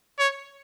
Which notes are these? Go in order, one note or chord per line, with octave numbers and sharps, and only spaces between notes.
C#5